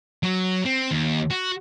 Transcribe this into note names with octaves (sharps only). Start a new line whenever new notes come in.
F#3
C4
D#2
F#4